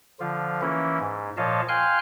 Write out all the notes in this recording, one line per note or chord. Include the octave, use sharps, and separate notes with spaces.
D3 F3 F4
E3 A#3 C#4 E4
G#2
A#2 F3 C#5 D#5 F5 A5
F5 G5 G#5 C6 F6 F#6